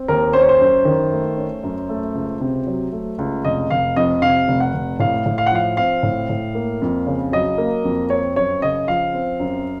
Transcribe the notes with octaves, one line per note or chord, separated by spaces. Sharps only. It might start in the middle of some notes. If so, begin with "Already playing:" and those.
Already playing: C4
D#2 A#4
C#4 C5
C#5
C5
F#2
D#3
A3
C#4
F#2
A3
C#2
C3
F#3
A3
C#2
F1 D#5
F1 F5
F2 D#5
C3 F5
F1
F#5
F1
A2 F5
A2
F5
F#5
F3 F5
C4 F5
A2
A2
A#3
F2
C#3
F#3 D#5
A#3
F2
C4 C#5
F#2 C#5
C#3 D#5
F3 F5
C4
F#2